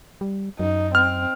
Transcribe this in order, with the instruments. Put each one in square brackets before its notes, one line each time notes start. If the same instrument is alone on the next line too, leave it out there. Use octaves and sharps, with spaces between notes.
[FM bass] G3
[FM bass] F#2 [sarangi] D#4
[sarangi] C4 [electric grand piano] F6